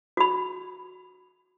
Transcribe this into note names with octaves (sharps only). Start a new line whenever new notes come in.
F#4 B5